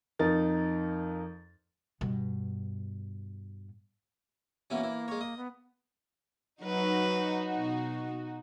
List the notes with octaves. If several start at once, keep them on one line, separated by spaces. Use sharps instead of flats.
F2 D#4 A#4 A6
G2 B2
B2 E3 A#3 C#4
E3
G#3 C#5
D#5
B3
F#3 D#4 F#4 B4
B2